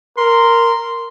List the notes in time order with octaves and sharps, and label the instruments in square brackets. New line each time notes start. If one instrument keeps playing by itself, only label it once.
[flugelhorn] A#4 [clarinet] C6